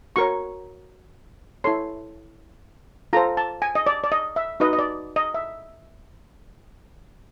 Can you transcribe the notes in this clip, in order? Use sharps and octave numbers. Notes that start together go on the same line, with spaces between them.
F#4 A#4 C#5 C#6
E4 A4 C#5 C6
F4 A4 C5 A#5
A5
G#5
D#5
D5
D5
D#5
E5
D#4 F#4 B4 D#5
D#5
D5
D#5
E5